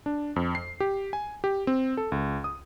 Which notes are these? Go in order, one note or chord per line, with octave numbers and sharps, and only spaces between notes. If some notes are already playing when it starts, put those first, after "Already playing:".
D4
F2
C7
G4
G#5
G4
C4
A4
C#2
D#6